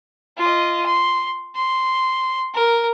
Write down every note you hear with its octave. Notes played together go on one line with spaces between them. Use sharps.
F4 D#5
C6
C6
A#4